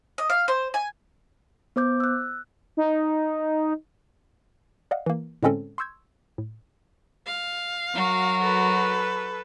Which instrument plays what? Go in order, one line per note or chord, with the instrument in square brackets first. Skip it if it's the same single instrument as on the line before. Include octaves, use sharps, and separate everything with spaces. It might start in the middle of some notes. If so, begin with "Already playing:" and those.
[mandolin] D#5
F5
C5
G#5
[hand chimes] B3 C5 D6 G6
E6 F#6
[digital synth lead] D#4
[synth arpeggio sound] D5 D#5 F5 F#5
E3 A#3
A2 D3 G#3 C4 C#4 A4
C6 C#6 E6 G6 G#6
A2
[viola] F5
[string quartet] F#3 F#4 A#4
[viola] A4 B4